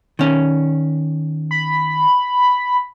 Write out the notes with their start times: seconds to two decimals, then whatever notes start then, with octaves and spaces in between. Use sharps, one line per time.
0.19 D#3 C#4
1.51 B5